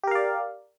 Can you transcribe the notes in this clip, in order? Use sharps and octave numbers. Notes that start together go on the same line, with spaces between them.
G4 A#4 D5 F5